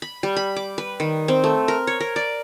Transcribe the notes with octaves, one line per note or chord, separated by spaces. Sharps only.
B5
G3
B5
D6
B4
D#3
C4
A3
A#4
C#5
A#4
D5